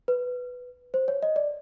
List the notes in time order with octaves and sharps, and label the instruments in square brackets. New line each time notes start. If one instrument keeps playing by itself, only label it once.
[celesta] B4
C5
C#5
D#5
D5